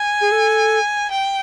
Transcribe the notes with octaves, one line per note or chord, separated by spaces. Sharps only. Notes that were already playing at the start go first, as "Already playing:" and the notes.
Already playing: G#5
G#4
A4
G5